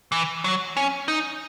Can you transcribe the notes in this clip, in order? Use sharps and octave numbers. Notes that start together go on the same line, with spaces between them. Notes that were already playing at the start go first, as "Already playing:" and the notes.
E3
F#3
C#4
D#4